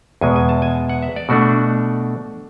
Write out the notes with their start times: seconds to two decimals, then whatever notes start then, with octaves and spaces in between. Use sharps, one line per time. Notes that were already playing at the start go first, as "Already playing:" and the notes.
0.21 E2 B2 G#3 G#5
0.36 G#5
0.49 A5
0.62 G#5
0.89 F#5
1.02 E5
1.16 D5
1.29 B2 A3 D4 F#4